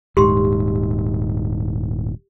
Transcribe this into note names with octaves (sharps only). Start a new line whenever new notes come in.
D#1 G#2 G4 C6